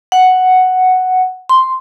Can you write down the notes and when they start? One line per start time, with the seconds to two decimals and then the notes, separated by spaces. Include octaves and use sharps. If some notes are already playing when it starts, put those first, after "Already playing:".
0.12 F#5
1.49 C6